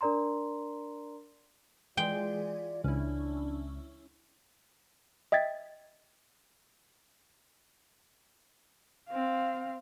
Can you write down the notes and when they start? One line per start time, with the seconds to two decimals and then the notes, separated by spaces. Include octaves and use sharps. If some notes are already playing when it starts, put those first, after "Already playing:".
0.01 D4 A#4 D5 A#5 C6
1.97 E3 G#3 F4 G#4 D5 G5
2.84 C#2 C#4 D4 E4
5.32 D#5 E5 G5 G#6 A6 B6
9.09 C4 F5